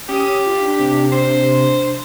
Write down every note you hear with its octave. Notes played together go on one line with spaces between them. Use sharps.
C#4 G4 D#6 D#7
F4
D4 B6
C3
D4 C5